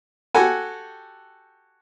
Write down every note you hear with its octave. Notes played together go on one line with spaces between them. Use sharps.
F#4 G4 A4 F#5 G#5